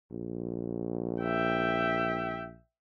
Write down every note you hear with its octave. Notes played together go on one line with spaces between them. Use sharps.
A#1
E5 G5